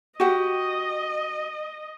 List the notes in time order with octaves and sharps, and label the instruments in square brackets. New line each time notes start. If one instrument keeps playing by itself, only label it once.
[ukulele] F#4 G4 F#5 [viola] D#5